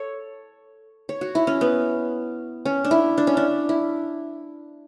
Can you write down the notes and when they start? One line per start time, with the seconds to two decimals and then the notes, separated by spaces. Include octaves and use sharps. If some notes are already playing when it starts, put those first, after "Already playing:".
Already playing: A4 C#5
1.09 C#5
1.21 F#4
1.35 E4
1.47 C#4
1.61 B3
2.65 C#4
2.84 D4
2.91 E4
3.18 D4
3.27 C#4
3.37 D4
3.69 E4